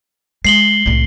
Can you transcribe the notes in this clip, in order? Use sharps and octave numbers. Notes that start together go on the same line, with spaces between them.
G#3 C7 F#7 G7
C2 A2